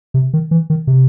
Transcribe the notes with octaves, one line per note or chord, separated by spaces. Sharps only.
C3
D#3
E3
D#3
C3